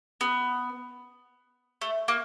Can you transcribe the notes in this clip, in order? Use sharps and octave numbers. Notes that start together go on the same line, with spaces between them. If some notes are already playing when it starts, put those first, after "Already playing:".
B3
A3
A#3